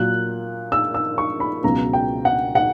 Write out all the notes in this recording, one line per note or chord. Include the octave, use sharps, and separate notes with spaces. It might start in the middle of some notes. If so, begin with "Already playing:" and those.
Already playing: A#2 F#3 F#6
E6
E6
C#6
B5
C#2 B2 F#3 A#5
G5
F#5
F#5